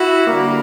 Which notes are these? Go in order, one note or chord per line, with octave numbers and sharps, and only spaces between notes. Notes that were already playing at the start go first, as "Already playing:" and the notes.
Already playing: E4 F#4
D3 G3 A#3